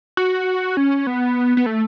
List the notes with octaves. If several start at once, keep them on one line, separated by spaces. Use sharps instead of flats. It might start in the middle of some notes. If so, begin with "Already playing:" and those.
F#4
C#4
B3
B3
A3